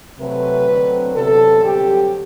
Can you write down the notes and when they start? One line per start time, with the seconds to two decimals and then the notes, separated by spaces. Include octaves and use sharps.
0.18 D2 C3 F#3 A3 C4 B4
0.66 D2 D3 F#3 C4
1.14 E2 C3 F#3 B3 D4 A4
1.62 G2 D3 F#3 C4 G4